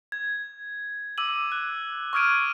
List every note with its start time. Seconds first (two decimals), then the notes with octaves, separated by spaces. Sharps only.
0.12 G#6
1.18 D6 E6 D#7 F#7
1.52 F#6
2.13 C#6 D#6 F6 G#6 D7 D#7